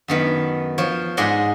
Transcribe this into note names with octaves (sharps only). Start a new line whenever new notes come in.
F#2 D#3 B3
F3 C#5
G#2 G#4 D5 D#5 F#5 C6